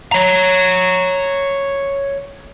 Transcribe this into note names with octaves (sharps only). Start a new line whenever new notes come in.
C#5 A#5